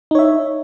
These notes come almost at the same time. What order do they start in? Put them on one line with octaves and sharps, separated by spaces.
D#4 C#5 E5